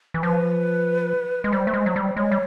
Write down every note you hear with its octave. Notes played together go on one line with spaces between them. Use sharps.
E3
F3 B4
G#3
G3 C5
A3
G#3
F#3
G3
C5
G#3 C#5
G3